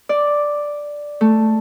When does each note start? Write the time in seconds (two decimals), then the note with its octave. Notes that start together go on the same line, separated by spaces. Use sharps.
0.09 D5
1.21 A3